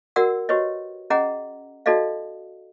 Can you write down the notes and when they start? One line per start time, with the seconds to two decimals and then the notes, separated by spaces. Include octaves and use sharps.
0.16 F#4 A#4 D5 F#5 E6
0.49 F#4 G4 B4 C#5 D#5
1.10 C#4 G#4 D#5 F#5 A#5
1.86 D#4 F#4 A4 D5 D#5 F5